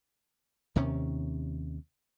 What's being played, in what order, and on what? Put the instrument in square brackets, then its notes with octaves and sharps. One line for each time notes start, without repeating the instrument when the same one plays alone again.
[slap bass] D#2 C3 D#3 C#4